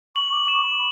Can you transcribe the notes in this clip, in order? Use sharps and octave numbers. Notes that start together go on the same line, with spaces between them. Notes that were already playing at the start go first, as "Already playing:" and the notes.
C#6 F#7
D6
D6
C#6 E7
B5